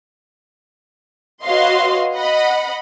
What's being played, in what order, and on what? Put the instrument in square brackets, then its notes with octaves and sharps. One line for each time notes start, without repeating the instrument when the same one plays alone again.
[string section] F#4 B4 C#5 D#5 F5 C6
D#5 F#5 B5